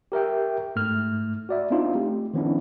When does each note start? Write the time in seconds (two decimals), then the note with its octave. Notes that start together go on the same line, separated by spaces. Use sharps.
0.12 G4 A#4 E5 G5
0.76 G#2 A3 F6
1.49 F#4 D5 E5
1.70 B3 C4 D4 D#4 F4
1.95 A3 G4
2.34 D#3 F3 B3 C#4 D4 E4